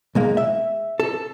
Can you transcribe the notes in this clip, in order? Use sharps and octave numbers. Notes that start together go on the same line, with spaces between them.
B1 G#3 A#3
E5
A4